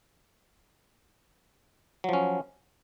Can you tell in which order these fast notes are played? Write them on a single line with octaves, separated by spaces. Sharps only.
F#3 F3 C#4